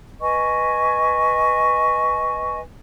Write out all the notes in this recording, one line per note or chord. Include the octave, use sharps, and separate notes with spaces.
B4 D#5 G#5 C#6